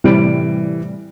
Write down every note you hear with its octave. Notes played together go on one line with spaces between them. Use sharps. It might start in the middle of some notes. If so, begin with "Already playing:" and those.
A2 C3 E3 G3 D7